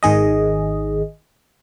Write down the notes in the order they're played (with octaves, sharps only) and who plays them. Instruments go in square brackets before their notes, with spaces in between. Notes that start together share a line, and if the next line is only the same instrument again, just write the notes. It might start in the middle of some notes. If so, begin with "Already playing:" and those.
[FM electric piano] G#1 D#3 G#4 D#5